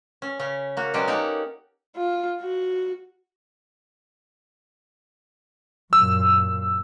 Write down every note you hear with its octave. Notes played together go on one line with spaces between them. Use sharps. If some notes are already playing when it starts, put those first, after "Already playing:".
C#4
C#3 C#4
A#3 F#4
B2 F#3 G#3 C#4 G4 D5
A#3 D#4 G4 A4 F#5
F4
F#4
F#2 A#2 E6